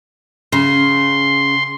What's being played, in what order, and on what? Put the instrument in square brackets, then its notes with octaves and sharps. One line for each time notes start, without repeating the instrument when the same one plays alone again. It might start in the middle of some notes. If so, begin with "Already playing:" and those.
[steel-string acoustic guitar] C#3 [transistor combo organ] C6